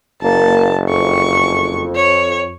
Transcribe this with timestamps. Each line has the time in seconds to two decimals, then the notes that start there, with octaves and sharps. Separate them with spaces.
0.22 F#1 A#3 A5
0.89 F2 C#6
1.96 C#5